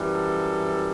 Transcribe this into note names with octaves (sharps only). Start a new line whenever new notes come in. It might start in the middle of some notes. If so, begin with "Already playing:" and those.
Already playing: F#2 E3 G3
A4